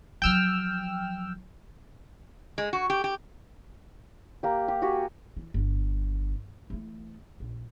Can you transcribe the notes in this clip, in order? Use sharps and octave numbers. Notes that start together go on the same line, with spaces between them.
F3 F#3 G5 E6 F6
G#3
F#4
G4
G4
A#3 G4
G4
F#4 G4 G#5
E3
G1
E3 A3
A#1